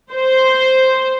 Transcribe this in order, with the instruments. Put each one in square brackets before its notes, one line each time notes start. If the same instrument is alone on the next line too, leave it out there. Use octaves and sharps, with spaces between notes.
[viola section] C5